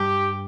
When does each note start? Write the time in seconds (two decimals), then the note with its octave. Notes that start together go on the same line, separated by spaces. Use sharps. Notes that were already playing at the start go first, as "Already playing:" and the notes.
Already playing: G2 G4